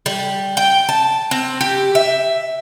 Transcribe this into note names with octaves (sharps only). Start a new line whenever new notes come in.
G3
G5
A5
C4
G4
E5